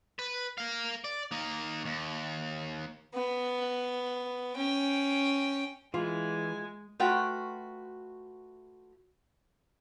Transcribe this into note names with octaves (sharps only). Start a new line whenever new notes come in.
B4
A#4 F5
D5
A#3 D#4
D#2
B3
C#4 G5
E3 G#3 F4 G#5
A3 F4 F#4 B4 G5